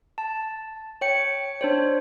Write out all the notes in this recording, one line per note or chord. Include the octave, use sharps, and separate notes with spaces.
A5
C#5 G5 C#7
D4 C5 C#5